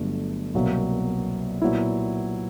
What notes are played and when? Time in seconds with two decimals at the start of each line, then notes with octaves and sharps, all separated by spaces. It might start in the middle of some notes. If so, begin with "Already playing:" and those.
Already playing: G1 G2 D3 F#3 A3
0.54 C2 B2 F#3 A#3
1.62 A#2 F#3 B3 E4